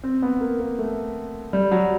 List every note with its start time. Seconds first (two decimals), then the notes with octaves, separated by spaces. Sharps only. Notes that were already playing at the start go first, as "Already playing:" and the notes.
0.03 C4
0.22 B3
0.41 A#3
0.60 A#3
0.79 A3
1.53 G3
1.72 F#3